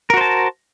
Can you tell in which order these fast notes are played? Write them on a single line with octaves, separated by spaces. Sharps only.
A#4 F#4 C5 A5